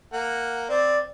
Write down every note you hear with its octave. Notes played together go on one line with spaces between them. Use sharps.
A#3 F#5
C4 D5